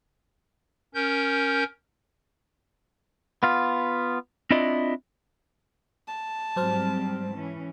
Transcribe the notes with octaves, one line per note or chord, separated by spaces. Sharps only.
C#4 A#4 G6
B3 F4
C4 D4 E4 F4 D5 D#5
A5
G#2 F#3 G3 C4 C5 F6
E3 C#4